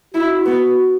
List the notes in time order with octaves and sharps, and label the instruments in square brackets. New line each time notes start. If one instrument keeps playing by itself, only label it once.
[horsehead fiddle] E4 [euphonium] F#4
[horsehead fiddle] B3